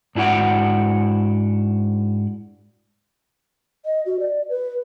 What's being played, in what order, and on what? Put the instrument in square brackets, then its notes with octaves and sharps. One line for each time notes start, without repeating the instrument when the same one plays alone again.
[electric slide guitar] G#2 D4 E4 F#4 F#5 G5
[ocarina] D#5
F#4
D5
B4